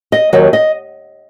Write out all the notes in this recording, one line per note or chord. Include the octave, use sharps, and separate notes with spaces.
D#5
D#2 D#3 F#3 D#5
D#5